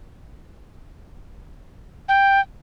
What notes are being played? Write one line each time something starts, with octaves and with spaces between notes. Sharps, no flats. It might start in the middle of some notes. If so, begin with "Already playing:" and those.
G5